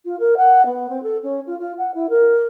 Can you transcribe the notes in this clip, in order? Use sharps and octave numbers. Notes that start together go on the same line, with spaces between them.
F4
A#4
F#5
B3
C4
A4
C#4
F4
F4
F#5
E4
A#4